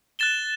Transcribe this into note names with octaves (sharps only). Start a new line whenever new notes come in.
F#6 A6 E7 G7